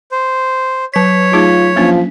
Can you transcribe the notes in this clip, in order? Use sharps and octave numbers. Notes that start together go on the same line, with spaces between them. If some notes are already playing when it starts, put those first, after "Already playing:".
C5
F#3 C#5 B6
A3 D#4 F4 G#4
F3 A#3 C#4 D4